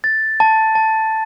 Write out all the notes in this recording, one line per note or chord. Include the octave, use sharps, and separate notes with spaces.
A6
A5
A5